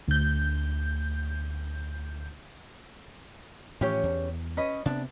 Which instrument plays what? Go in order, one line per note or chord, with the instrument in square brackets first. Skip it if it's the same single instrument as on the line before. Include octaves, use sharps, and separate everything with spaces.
[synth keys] D2 G6
[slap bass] A2 E3 F3 [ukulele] C#4 G4 C#5
[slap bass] E2
[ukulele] C#4 B4 D#5
[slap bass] C3 B3 [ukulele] D4